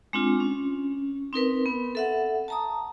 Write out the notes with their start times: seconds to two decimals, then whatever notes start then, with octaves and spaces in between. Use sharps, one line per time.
0.13 G#3 C4 D4 F4
0.40 C#4
1.33 C4 D#4 A#4 B4
1.66 B3
1.95 A4 E5 F#5
2.48 A5 A#5 D#6